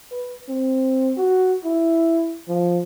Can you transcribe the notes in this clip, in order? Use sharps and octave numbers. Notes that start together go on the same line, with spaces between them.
B4
C4
F#4
E4
F3